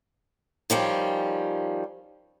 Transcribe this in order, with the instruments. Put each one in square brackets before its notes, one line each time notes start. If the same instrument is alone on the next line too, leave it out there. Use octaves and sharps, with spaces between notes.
[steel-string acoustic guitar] D#3 F3 G3 C#4